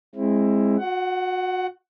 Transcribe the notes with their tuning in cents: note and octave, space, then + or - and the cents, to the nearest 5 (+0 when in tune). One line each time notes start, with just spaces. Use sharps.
G#3 +0 C4 +25 E4 +10
F#4 -30 F#5 +15